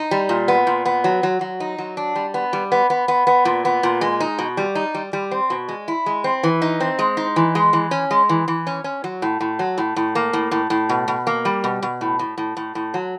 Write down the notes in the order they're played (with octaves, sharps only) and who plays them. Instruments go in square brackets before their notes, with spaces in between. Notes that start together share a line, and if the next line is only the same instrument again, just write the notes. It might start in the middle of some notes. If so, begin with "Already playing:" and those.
Already playing: [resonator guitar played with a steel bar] D#4
G3
A#2
B3
A#2
B3
F#3
F#3
F#3
D#4
F#3
D4
G3
B3
G3
B3
B3
B3
B3
A#2
B3
A#2
G#3
D#4
B2
G3
D#4
G3
G3
C4
B2
G#3
E4
G#3
C4
E3
D#4
C4
G#3
D#4
E3
G#3
E3
C#4
G#3
E3
E3
C#4
C#4
F#3
A2
A2
F#3
A2
A2
A#3
A2
A2
A2
B2
B2
A#3
G3
B2
B2
A2
A2
A2
A2
A2
F#3